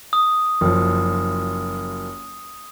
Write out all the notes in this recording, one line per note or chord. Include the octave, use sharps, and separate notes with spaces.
D#6
F#1 F3